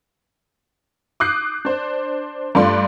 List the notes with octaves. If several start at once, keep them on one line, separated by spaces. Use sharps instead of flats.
D6 D#6 F#6 G6 C7
D4 C5
G2 A3 D4 F4 D5 C6